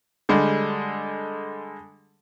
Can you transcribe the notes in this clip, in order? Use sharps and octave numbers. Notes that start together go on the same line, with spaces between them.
D3 G3 G#3